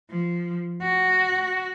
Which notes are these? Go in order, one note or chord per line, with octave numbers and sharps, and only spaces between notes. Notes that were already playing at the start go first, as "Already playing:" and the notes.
F3
F#4